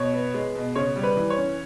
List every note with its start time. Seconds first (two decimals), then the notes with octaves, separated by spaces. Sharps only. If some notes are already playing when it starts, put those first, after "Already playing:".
Already playing: B2 C#5
0.14 B3
0.34 G#3
0.55 B2
0.76 C#3 C#5
0.96 G3
1.03 B4
1.17 E3
1.30 C#5
1.38 C#4